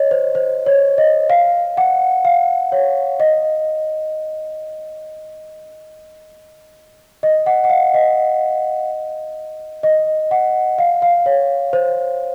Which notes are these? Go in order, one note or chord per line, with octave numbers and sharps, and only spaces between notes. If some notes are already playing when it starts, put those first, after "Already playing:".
Already playing: C#5 D#5
C5
C5
C#5
D#5
F5
F#5
F5
C#5
D#5
D#5
F#5
F#5
F5
D#5
D#5
F#5
F5
F5
C#5
C5